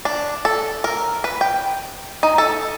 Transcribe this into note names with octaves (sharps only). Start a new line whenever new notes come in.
D4
A4
A#4
B4
G5
D#4
A4